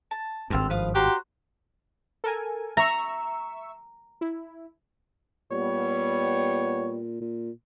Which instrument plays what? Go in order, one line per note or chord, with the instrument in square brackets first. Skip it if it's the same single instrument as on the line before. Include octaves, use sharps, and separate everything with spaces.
[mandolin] A5
[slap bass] G#1 G2 [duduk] C4 [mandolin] A4 F6
[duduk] F3 [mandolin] B4 F5 D#6
[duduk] F#4 [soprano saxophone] G4 [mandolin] C5 A#5 C6
[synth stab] A4 A#4 G#5
[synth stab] E5 C#6 E6 [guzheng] A#5
[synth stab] E4
[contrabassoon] A#2 [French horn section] G3 B3 [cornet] C#5
[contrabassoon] A#2